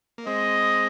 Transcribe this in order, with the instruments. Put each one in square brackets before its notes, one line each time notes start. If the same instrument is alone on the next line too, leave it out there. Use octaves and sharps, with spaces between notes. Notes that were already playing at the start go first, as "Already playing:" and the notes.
[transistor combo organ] A#3
[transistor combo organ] G#3 C4 [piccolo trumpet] D#5